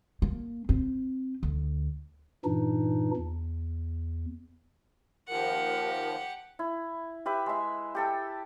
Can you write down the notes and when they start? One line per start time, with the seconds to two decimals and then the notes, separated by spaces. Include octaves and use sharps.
0.22 A#3
0.69 C4
1.43 D2
2.45 G2 A#2 E3 D4 D#4
3.17 E2
5.29 D#2 F3 G4 A#4 F#5
6.59 E4
7.26 G4 B4 E5
7.46 G#3 E5
7.95 G4 A4 G5